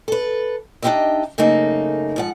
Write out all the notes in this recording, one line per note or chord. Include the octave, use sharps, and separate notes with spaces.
A4 B4
D4 D#4 F4 G4 D#5 E5
F#2 C#3 A3 A#3 D#4
G#2 F3 F#5